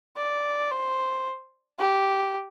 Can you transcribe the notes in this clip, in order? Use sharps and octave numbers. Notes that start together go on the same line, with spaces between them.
D5
C5
G4